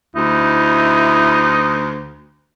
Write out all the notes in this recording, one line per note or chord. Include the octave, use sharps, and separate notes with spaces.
D2 D#4 E4